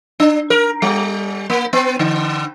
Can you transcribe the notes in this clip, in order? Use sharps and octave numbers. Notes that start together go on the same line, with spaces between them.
D4
A#4
G3
A#3
B3
D3